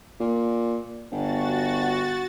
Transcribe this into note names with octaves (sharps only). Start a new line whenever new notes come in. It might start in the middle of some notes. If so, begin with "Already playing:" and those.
A#2
G1 F#4 A6